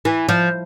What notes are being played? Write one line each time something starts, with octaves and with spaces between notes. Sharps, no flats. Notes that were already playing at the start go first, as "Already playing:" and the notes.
E3
F3